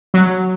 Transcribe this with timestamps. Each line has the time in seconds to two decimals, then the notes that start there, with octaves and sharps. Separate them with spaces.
0.14 F#3